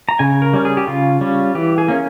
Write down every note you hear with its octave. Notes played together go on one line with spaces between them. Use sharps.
A#5
C#3 G#5
A#4
G3 C#4
G#4
G4
C#3 F4
G3 C#4
E3 G4
G#4
A#3 C#4